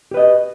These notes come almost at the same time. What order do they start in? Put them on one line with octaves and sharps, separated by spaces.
G4 B4 D#5